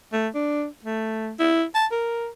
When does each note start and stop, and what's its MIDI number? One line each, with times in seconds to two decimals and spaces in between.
0.13 0.28 57
0.34 0.66 62
0.84 1.32 57
1.39 1.65 64
1.75 1.86 81
1.91 2.29 70